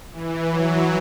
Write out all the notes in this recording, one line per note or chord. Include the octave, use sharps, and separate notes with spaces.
E3
F#3